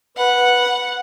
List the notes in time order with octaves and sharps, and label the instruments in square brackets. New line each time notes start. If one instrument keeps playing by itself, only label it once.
[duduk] B4 [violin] F#5